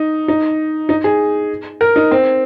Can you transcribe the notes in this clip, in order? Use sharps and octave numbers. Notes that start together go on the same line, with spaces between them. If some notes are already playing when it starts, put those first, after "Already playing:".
Already playing: D#4
D#4
D#4
G#4
A#4
D#4
C4